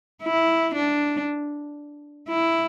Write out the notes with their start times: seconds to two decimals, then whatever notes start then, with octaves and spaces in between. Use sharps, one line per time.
0.23 E4
0.74 D4
2.28 E4